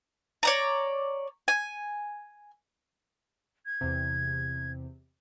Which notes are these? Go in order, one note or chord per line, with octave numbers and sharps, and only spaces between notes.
C#5 D5 A#5
G#5
G#6
E2 C3